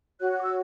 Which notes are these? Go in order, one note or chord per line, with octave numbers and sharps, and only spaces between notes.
F#4 C#5 F#6
F#6
D6
E6